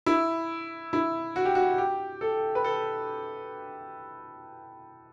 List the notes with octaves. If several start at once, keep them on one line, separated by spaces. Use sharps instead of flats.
E4
E4
F#4
G4
F#4
G4
A4
B4
A4